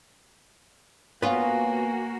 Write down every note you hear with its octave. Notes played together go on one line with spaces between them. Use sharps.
A#3 B3 F4 F#4 B4 C#5 F5 G#5